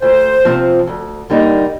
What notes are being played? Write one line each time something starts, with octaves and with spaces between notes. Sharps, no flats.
D2 C5
C3 F3 C4
D2
D3 G3 A#3 D#4